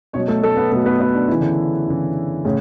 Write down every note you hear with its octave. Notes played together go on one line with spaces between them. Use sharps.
B2 F#3 C#4 C#5
A3 A4
A3 A4
B3 B4
B2 F#3 A3 A4
B3 B4
B3 B4
D4
C#3 E3 E4
D3 D4
C#3 E3
A2 C#3 C#4